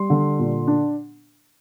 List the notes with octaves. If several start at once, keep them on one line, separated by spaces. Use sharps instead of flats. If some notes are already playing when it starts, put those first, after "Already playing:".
Already playing: G3 C6
D3
A#2
D4